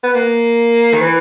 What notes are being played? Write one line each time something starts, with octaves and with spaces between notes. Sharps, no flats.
B3
A#3
D#3
E3